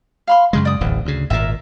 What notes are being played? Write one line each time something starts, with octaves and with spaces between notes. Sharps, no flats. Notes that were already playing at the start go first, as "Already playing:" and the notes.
F5 B5 C6
F#2 C#3 G#3 C6
D5 D#6
D1 A1 E2
D2 C#3
G#1 A#2 A#4 E5